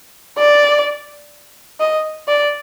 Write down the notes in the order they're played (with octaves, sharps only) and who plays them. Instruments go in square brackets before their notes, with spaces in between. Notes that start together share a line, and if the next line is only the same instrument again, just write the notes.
[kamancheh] D5
D#5
D5